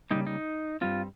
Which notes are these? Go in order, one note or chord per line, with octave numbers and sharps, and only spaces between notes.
C#3 G3 A#3 D#4
D#4
G2 G3 C4 F4